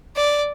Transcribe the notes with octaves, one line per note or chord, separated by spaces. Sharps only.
D5